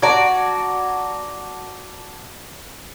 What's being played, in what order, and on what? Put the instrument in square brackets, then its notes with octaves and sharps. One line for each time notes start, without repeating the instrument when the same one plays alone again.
[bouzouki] F#4 D5 [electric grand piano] A5 A#5 G#6